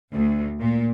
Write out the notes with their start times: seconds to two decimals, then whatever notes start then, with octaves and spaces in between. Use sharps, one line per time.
0.12 D2
0.60 A#2